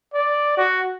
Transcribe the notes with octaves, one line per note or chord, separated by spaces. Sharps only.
D5
F#4